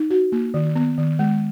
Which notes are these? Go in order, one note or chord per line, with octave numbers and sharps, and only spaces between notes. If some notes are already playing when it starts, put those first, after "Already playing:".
Already playing: D#4
F#4
A#3
D#3
B3
D#3
G#3